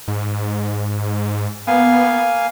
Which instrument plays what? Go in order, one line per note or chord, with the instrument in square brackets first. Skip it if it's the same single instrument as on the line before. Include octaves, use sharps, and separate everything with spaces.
[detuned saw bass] G#2
[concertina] A#3 F5 G#5 [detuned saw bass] B3